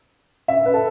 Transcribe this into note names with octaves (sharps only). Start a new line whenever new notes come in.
E5
B4
A4